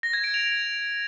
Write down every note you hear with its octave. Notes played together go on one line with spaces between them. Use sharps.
A#6
G#6
D7
F7